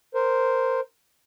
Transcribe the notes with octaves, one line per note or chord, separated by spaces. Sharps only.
A#4 C5